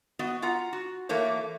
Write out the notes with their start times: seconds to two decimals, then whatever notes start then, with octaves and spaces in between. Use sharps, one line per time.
0.19 B3 F#4 D#5
0.42 F4 F#5 A#5
0.73 F#4
1.09 E3 A3 A#3 C#5